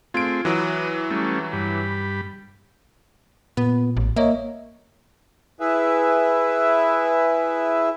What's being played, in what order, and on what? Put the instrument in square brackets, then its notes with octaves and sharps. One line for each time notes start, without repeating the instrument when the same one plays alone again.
[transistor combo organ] A3 C4 G#4 [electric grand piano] F4 D7
[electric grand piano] E3 F#3 [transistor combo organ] F#4 D#6
[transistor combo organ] G3 A3 C#4
G2 G3 B5
[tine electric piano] A#2 [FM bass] B3
[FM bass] A1
[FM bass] A#3 [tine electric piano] C#5 D#5 E5
[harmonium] E4 G#4 B4 E5